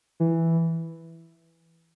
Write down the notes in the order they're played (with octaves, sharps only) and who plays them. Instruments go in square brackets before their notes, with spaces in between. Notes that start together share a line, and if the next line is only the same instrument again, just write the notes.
[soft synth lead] E3